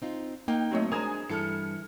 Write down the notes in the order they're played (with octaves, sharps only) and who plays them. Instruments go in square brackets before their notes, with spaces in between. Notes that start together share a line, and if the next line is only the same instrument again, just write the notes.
[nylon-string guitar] C4 D#4 F4
[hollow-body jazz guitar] A#3 [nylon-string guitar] D#4 [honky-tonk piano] G5
[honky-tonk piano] F#3 C#5 D#5 [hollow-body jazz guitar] A3 A#3 C4
[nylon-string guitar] G#3 D4 [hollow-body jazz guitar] A#4 C5 A#5 [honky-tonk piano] G#5 D#6 G#6
[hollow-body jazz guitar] G2 [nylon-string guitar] E3 E4 A4 [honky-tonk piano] F6 C#7